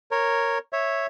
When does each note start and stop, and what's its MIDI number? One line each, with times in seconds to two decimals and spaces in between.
0.11 0.58 70
0.11 0.58 73
0.73 1.07 73
0.73 1.07 76